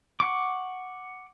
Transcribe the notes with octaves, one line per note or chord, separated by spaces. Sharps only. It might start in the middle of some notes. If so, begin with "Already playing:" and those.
F#5 C#6 D6